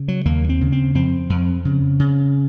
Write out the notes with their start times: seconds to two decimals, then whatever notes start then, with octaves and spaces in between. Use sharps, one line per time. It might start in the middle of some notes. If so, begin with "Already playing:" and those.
Already playing: C#3
0.08 F#3
0.25 D#2 A#3
0.49 C4
0.61 C#3
0.72 C4
0.95 F2 C4
1.30 F2
1.65 C#3
1.99 C#3